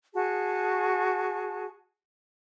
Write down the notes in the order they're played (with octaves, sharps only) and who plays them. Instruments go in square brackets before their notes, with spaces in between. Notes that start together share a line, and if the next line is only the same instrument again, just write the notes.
[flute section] F#4 G#4 A5